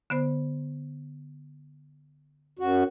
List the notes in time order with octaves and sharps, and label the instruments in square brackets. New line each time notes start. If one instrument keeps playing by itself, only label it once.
[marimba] D3 B3 C5
[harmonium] F#2 F#4